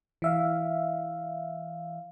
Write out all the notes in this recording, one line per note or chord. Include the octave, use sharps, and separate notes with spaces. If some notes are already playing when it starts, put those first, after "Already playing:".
E3 E5 F5